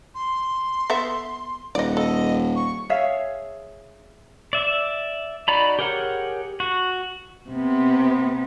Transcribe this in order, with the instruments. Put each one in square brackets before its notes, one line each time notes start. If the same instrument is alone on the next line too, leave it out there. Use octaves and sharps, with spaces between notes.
[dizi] C6
[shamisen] B3 A4 E5
[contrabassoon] D#1 [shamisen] D5 D#5 [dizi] F#5
[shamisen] A4 [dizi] D#5
[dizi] C#6
[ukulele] G#4 C#5 E5 F5
[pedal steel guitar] D5 E5
D#4 F#4 D5 A#5 B5
G4 G#4 A#4 C#5 F#5
F#4
[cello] C3 B3